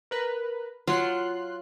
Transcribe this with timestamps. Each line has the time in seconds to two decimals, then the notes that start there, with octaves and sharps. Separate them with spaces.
0.11 A#4 B4
0.87 F#3 F4 C6 F#6